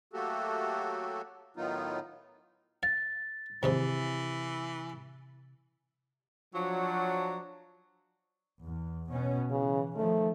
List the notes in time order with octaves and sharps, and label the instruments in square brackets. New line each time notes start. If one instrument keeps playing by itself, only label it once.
[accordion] F#3 A3 A#3 F#4 G4 A4
A2 D#3 F#3 B3 D#4 F4
[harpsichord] F5 [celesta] A6
[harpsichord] D#2 G#2 F3 [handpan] C3 [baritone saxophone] E3
[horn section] F3 F#3 D4
[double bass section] E2
B2 C#4
[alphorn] C#3 [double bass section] E3
[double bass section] D#3 F3 [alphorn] A3